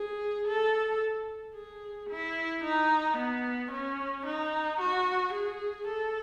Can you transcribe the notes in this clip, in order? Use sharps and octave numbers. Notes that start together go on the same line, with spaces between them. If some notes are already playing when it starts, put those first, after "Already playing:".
Already playing: G#4
A4
G#4
E4
D#4
B3
C#4
D#4
F#4
G#4
A4